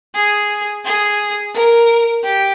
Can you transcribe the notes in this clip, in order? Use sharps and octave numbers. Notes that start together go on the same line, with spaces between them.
G#4
G#4
A#4
G4